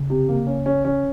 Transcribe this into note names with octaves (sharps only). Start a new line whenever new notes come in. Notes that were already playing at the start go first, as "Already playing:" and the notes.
Already playing: C#3
C3
A#3
C#4
C#4
C#4